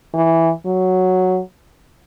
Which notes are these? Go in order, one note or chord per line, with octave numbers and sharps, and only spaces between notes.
E3
F#3